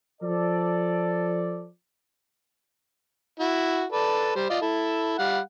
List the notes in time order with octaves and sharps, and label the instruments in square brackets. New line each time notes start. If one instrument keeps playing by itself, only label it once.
[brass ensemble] F3 A4 D5
[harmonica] E4 F#4
A4 B4 D5
G3 C5
F4 D5 D#5
E4 A4
G3 F5 F#5